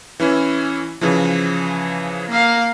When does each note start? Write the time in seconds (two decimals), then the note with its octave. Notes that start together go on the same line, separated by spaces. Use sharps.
0.20 E3 C#4 E4
1.01 C#3 E3 F3
2.28 A#3 F5